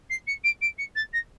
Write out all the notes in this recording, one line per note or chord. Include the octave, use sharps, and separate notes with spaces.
C7
C#7
D7
D7
C#7
A6
A#6